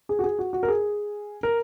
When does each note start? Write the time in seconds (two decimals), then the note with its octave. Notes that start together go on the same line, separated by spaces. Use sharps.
0.09 G#4
0.19 F#4
0.24 G#4
0.39 F#4
0.53 F#4
0.63 A#4
0.68 G#4
1.43 A#4